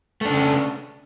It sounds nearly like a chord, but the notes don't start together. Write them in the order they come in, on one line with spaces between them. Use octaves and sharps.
A3 D4 C#3